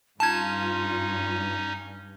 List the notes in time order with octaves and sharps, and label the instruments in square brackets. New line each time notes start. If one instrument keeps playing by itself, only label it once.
[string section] G2 [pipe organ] C#4 D#4 [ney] F4 [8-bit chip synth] A5 G#6